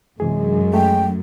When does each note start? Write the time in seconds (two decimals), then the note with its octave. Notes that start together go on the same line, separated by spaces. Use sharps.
0.20 F#2 C3 E3 G#3 G#4
0.74 A3 G5